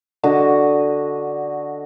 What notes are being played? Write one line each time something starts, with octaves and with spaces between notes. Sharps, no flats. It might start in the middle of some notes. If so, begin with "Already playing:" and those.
D3 F#4 D#5